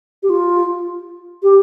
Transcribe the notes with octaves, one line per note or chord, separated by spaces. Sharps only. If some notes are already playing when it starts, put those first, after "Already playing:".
G4
F4
G4